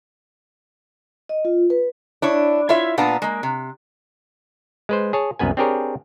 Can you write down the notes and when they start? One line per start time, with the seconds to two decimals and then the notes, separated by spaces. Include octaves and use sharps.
1.29 D#5
1.45 F4
1.70 B4
2.22 D4 E4 C#5
2.69 E4 F4 C#5 E5
2.98 A#2 B3 D4 F5 A5 A#5
3.22 G#3 A#3
3.43 C3
4.89 G#3 B4 C5
5.13 G#4 C#5 A5
5.39 C2 F#2 B3 B4 G#5
5.57 C4 D4 G4 G#4 A#4 C#5